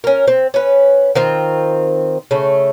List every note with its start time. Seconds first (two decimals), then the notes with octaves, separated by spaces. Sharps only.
0.04 C#4 A#4
0.28 C4
0.54 C#4 B4
1.15 D#3 C4 F4
2.31 C#3 A3